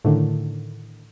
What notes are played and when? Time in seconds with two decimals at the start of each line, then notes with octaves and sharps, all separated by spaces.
0.05 A2 D3 D#3